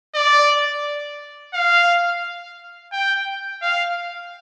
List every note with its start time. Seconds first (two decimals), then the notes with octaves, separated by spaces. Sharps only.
0.15 D5
1.54 F5
2.92 G5
3.62 F5